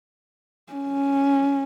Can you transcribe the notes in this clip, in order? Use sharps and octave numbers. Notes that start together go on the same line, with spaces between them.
C#4